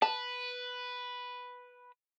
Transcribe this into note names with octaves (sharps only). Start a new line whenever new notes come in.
B4 A5